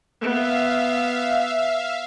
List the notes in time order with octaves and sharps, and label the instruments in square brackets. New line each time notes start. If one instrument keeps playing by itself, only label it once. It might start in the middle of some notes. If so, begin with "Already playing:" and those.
[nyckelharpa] B3 [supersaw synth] E5 F5